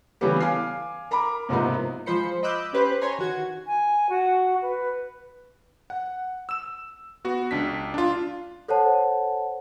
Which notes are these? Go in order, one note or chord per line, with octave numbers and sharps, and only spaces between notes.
C#3 E3 G3 A3 B3 G4
F5 G#5 D6 F6 C7
A#4 A#5 B5 D6
G#2 C3 F3 A#3 B3 D#4
F3 G#3 F4 C5 B5 C#7
D#5 B5 D6 E6 F#6 G6
C#4 G4 B4 C5
C#5 G#5 A#5 C6
D#3 F#4 G#6
G#5
F#4
B4
F#5
E6 E7
B3 F#4
C#2 D4 B6
D4 F4
A4 C5 C#5 F#5 A5